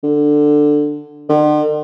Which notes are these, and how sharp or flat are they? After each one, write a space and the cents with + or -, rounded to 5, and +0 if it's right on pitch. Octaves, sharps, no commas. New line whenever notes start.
D3 +10
D3 +45